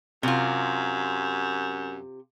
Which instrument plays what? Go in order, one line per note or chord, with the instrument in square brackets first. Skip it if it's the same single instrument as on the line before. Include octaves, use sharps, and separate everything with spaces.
[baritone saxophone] F#2 [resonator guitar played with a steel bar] C3 F4